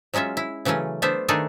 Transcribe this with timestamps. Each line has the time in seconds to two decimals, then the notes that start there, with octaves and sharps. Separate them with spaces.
0.14 F#3 G#3 C#4 F4 E5
0.37 E4
0.65 C#3 E3 F#3 A3 C#4
1.02 A3 B3 D4 C5 E5
1.28 D#3 A3 D4 D#4 G#4 A4